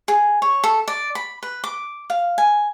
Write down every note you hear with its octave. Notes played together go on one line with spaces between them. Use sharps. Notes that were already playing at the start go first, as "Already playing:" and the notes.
G#4
C#5
A4
D5
B5
B4
D6
F5
G#5